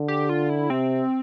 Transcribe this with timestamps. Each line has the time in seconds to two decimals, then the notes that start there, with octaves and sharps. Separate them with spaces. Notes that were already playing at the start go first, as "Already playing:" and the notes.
Already playing: D3
0.08 G4
0.29 F4
0.49 E4
0.70 C3 C4